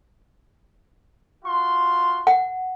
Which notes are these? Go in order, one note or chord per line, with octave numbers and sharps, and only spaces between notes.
F4 F#4 C6
F#5